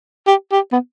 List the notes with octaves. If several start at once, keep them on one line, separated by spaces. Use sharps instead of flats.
G4
G4
B3